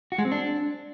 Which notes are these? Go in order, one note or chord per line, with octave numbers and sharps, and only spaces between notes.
F#4
G#3
C4
D4